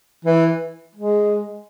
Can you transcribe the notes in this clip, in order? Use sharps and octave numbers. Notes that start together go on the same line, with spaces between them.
E3
G#3